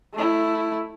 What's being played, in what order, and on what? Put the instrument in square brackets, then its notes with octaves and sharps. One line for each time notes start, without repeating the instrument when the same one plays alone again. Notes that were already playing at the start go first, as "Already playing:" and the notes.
[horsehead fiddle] A3 E4